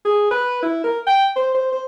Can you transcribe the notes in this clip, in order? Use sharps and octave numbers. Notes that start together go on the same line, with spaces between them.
G#4
B4
E4
A#4
G5
C5
C5
C5